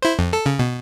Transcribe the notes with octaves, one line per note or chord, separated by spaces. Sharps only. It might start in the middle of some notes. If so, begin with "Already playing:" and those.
E4 C5
F2
A4
C#3
B2